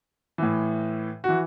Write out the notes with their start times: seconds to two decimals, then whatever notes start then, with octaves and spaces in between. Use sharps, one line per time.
0.38 A2 E3
1.24 E3 F#4